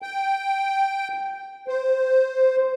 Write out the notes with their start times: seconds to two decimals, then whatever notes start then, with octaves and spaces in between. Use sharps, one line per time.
0.02 G5
1.68 C5